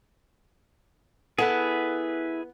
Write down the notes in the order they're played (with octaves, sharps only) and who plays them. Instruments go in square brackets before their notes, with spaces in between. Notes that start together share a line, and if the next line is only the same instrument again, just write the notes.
[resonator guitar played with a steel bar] B3 [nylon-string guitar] E4 A4 F#5 [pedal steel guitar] G#4 B4